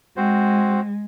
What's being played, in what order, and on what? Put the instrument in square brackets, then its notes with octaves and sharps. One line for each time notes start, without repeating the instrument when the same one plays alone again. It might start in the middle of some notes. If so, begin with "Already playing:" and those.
[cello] G#3 [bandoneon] C4 F#4 C5